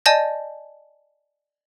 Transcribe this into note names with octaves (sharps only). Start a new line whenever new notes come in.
D5 D#5 G#5 A5 G6 A#6